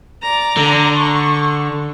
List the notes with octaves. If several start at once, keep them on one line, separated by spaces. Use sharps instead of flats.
D5 A#5
D3
C#6